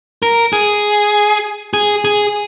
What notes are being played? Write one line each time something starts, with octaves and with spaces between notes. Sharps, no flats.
A#4
G#4
G#4
G#4